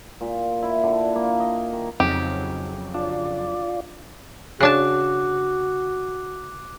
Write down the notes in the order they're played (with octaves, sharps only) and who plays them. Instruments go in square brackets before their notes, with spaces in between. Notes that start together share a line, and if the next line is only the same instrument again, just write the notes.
[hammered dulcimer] A#2
E4
D3
A#3
D#5
D#3
[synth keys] F2 C#3 F#3 [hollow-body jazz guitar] C4 D#4 F#4 [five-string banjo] G4
[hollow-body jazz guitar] D4 [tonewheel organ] F4 D5
[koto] C#3 D4 A5 [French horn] F#4 [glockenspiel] D6 F#6